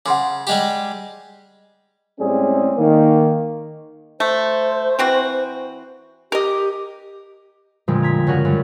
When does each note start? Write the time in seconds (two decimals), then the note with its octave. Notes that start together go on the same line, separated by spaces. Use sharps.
0.06 C#3 F#5 C6 D6
0.47 G3 G#3 G4
2.20 A2 G3 G#3 C4 C#4 G#4
2.77 D#3 A#3
4.20 A3 C5
4.99 E3 C4 F#4
6.32 G4 A#4 D#5
7.88 F2 A#2 D3 F3 G3 G#3
8.02 A#5 G#6 B6
8.27 G2 C#3 C#4 F#4 A#4 F#5
8.45 F#2 G3